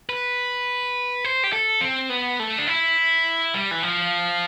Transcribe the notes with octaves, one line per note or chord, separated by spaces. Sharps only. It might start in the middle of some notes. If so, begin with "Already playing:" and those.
B4
C5
G4
A4
C4
B3
A3
D4
E4
G3
E3
F3